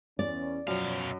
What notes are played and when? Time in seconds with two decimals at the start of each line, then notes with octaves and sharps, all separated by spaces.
0.19 E2 C#4 D5
0.67 F#2 B2 F3 C#5 F5